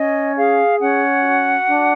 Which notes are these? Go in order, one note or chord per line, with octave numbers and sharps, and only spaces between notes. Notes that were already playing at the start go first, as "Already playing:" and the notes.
Already playing: C#4 D#5
G#4 F5
C#4 F#5
F#4
D4